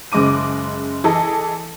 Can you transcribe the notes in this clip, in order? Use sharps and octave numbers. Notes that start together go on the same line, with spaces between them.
F#1 C#3 G#3 D#5 D6 D#7
E3 G#4 A4 D#5